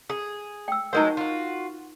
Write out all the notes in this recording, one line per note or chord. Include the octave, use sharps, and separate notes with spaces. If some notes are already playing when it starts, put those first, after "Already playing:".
G#4
G5 E6
F#3 G#3 D#4 A#4 C5 F#5
F4 F#4